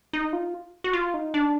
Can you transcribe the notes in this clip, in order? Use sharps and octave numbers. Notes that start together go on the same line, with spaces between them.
D#4
F4
F#4
F4
D#4
D4